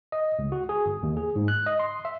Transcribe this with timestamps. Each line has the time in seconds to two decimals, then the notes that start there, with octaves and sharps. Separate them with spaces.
0.12 D#5
0.39 C#2
0.52 F#4
0.69 G#4
0.86 G1
1.03 D#2
1.17 G#4
1.36 G#2
1.48 F#6
1.66 D#5
1.79 C6
2.05 E5